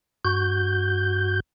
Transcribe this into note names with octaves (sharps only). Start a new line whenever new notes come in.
G2 F#4 G6